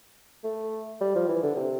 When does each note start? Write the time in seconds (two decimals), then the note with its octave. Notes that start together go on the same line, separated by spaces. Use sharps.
0.44 A3
1.00 G3
1.15 F3
1.28 E3
1.43 D3
1.56 C3